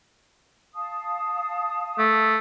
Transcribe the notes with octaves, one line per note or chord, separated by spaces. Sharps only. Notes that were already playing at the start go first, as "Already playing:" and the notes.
F5 A5 D#6
A3